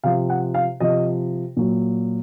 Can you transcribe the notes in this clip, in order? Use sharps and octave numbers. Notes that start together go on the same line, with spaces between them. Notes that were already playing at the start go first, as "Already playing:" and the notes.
C3 F3 F5
F#5
F5
C3 F3 D#5
A#2 F#3